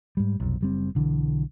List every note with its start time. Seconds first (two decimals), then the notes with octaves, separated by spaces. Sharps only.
0.17 G#2 G3
0.40 F1 B1
0.61 F#1 G3 C4
0.95 B1 D3 E3